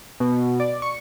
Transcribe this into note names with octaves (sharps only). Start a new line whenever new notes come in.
B2
D5
C#6